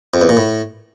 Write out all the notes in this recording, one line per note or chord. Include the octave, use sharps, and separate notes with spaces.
F2
E2
A#2
A2